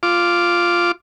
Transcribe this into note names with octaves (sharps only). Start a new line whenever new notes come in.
F4 D6